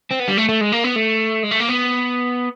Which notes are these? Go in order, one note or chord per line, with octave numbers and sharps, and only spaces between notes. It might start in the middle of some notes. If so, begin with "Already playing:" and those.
C4
B3
G3
A3
A3
G#3
A#3
B3
A3
G#3
A3
A#3
B3